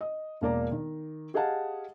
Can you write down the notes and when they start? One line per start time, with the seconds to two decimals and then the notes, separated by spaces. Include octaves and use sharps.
0.01 D#5
0.41 E1 A#3 D5 A#5
0.72 D#3
1.34 G4 G#4 D#5 F5 F#5 A5